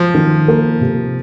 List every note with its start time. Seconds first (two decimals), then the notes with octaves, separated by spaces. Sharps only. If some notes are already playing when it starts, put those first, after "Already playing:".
Already playing: F3
0.14 D#3
0.48 A#3
0.81 C3